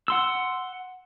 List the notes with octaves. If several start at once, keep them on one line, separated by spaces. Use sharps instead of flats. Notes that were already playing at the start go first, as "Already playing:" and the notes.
F#5 C6 E6